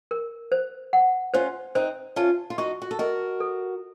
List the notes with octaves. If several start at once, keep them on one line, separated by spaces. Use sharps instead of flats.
A#4
C5
F#5
C#4 F4 C5
C4 D#4 C5
C#4 F4 A5
F4
D#4 F#4 C#6
F#4
A4
F#4 A#4 D#5
A4